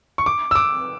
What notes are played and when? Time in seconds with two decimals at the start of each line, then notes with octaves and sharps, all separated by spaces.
0.18 C#6
0.26 D6
0.51 E6
0.55 D6